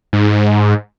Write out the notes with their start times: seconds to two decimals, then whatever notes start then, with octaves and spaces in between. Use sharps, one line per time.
0.13 G#2